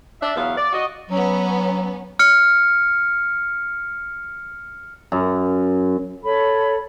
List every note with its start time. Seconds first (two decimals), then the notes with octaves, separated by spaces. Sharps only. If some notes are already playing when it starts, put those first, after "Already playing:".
0.21 D4 D5 E5
0.36 E2 F#3 B3 F5
0.57 D5
0.73 F#4 D#5
1.10 F#3 B3 C#4
2.19 F6 C#7
5.12 F#2
6.24 A4 C#5 B5